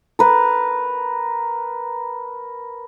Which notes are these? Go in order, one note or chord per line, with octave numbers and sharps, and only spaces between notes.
A#4 B4